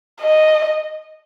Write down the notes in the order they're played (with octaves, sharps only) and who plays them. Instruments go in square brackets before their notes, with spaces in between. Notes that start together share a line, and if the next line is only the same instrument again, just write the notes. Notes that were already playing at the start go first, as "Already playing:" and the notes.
[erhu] D#5